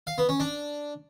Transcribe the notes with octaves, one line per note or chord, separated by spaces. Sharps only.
F5
B3
C#4
D4